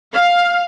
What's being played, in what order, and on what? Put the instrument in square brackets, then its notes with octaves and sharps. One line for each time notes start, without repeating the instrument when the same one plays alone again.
[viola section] F5